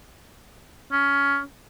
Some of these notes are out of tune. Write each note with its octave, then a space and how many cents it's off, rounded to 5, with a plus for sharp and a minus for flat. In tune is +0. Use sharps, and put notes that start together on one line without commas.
C#4 +15